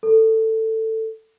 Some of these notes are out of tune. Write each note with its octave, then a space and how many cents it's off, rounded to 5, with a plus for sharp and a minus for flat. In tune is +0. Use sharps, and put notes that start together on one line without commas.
A4 +15